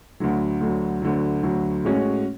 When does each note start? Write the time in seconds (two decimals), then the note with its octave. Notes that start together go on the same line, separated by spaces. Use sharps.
0.20 D2 D3 F#3
0.61 D2 D3 F#3
1.02 D2 D3 F#3
1.43 D2 D3 F#3
1.84 A2 G#3 C#4 F#4 C#5